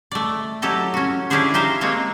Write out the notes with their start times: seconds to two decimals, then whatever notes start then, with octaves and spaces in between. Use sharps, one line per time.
0.12 A3 D5
0.62 F#3 E4 G4 A4 D#5
0.94 C#4 F#4
1.30 C#4 D4 E4 G4 G#4 C5
1.54 D#4 G4 C5 E5 F5 A#5
1.81 G#3 A#3 C4 G#4 C#5